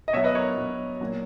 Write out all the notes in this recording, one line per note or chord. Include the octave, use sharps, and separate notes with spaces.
D#5
B2 F#3 C#5 E5
B4 D#5
A#4 C#5
B2 F#3
A#2 F#3